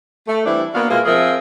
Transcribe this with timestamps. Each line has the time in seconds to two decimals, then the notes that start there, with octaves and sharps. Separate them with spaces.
0.28 A3
0.45 E3 G3 C4 D4 E4
0.74 A#3 B3 D4 F#4 B4 F5
0.90 B2 G#3 A#3 F4 A#4 E5
1.06 F3 C4 F4 G#4 A#4 E5